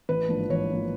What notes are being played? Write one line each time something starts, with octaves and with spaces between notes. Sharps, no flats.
A1 B4
G#2 F3 A#3 D4
A1 C#5
F3 A#3 D4